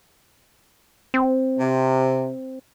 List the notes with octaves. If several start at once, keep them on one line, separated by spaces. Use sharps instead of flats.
C4
C3